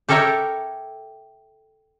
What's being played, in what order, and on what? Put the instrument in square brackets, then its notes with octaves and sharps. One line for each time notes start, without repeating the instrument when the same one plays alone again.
[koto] G4 A4 A#4 C#5 E5